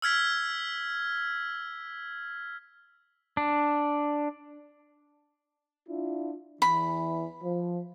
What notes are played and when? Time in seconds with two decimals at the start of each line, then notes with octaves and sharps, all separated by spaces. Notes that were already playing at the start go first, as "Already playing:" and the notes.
0.02 E6 F6 G#6 B6
3.37 D4
5.89 D4 E4 F4
6.62 E2 E3 B5
7.43 F3